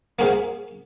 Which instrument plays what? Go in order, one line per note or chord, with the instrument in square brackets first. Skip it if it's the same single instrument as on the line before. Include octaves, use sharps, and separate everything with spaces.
[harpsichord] A#3 F4 F#4 G#4 C5 F5